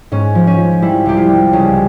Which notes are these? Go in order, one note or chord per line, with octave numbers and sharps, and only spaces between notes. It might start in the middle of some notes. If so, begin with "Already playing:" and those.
G#2 C#4
F3
C#4
F3
G3 E4
C2 G4
F4
G3
C#2 C#4